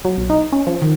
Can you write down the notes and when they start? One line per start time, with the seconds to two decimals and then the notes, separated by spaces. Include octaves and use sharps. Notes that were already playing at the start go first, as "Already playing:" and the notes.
0.05 F#3
0.17 B1
0.30 D#4
0.52 C#4
0.67 F3
0.82 D#3